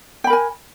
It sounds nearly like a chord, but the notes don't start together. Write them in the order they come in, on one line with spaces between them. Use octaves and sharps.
G5 B5 A#4 G#5